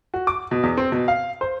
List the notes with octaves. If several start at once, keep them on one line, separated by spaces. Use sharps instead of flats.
F#4
D6
B2
E2
C4
B2
F5
C5